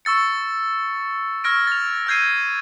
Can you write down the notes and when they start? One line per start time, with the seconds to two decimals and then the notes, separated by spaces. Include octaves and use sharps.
0.05 C#6 E6 A6 C#7
1.44 C#6 E6 F6 G#6 A#6 D7
1.67 A6 F7
2.07 E6 F6 G6 G#6 C7 D#7